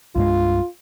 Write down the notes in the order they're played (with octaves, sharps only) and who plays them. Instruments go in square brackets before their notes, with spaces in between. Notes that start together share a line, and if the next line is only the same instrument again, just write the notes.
[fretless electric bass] C2 G2 G#3 [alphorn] F4